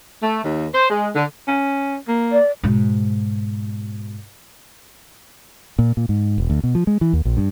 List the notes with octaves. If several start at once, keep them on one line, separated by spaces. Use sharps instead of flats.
A3
D#2
C5
G#3
D3
C#4
A#3
D5
G#2 B2
A#2
A#2
G#2
E1
D2
B2
F3
G#3
E3
D#2
A#1
G2